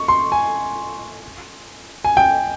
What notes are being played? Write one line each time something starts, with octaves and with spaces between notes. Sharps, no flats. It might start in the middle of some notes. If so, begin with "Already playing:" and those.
Already playing: C#6
C6
G#5
G#5
G5